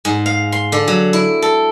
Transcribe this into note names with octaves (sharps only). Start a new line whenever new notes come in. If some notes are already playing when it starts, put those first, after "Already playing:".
G#2
F5
C6
D3
F#3
E4
A4